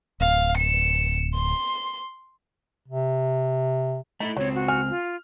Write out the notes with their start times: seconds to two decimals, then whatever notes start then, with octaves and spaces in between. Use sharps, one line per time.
0.21 D1 F5
0.57 C#7 E7
1.35 C6
2.88 C3
4.20 A3 D#4 E4
4.37 C#2 F#3 C4 C#5
4.55 F#4
4.68 G#5 F6
4.90 F4